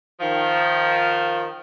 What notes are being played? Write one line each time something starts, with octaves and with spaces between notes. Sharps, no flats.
D#3 F3